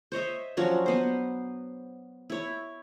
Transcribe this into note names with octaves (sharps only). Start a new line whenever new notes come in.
C5 C#5 D#5 E5
F3 F#3 C#4 D4
B3 F#4 C5
E4 C#5